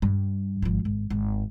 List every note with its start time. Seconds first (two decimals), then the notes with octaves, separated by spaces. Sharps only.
0.02 G2 G3
0.62 G#1 F3
0.85 G#1
1.10 G#1